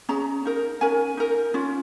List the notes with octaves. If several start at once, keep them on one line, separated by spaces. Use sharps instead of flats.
C#4 G#4 A#5
D#4 A#4
C#4 A#4 G#5
D#4 A#4
C#4 F4